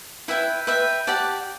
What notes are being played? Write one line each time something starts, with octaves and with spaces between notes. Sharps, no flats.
E4 B4 E5 G5
B4 E5 G5
G4 D5 F#5 A5